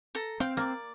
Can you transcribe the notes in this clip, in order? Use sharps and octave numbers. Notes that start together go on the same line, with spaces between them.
A4 A#5
C4 F5 G5
A#3 D5